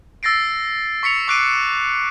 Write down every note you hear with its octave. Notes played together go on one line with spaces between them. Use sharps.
E6 A6 A#6 C7 D7
C#6 B6 C#7 F7
C#6 D6 F#6 C7 D7 D#7